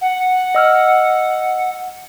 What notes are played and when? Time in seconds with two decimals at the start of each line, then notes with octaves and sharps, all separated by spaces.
0.01 F#5
0.55 D#5 E6 F6